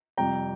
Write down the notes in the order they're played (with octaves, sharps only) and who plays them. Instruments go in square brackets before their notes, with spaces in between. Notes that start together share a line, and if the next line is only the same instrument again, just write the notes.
[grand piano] F2 C3 G3 G5 A#5